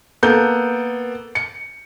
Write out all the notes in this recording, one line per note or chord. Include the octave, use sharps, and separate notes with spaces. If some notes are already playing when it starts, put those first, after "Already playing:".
A#3 B3 A4 G6
C#7